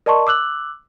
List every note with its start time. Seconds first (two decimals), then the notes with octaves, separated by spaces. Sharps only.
0.06 A#4 D5 D#5 A5 C6 C#6
0.27 D6 E6 F#6 F#7